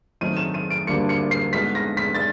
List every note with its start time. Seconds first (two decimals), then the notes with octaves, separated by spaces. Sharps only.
0.21 D#3 F#3 A3 C4 D#4 D#7
0.37 E7
0.54 D#7
0.70 D7
0.87 D2 D3 G3 A#3 D4 C#7
1.09 C#7
1.31 C7
1.53 G#3 B3 D#4 F#4 A4 B6
1.75 A#6
1.97 B6
2.15 A6